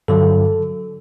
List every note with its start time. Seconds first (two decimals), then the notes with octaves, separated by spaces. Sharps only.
0.08 G2 D3 F#3 A4